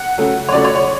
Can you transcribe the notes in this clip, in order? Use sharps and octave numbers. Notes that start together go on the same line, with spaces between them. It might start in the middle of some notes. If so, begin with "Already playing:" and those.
Already playing: F#5
C#3 F#3 A3
C#5
C#3 F#3 A3 D5
C#5
C#5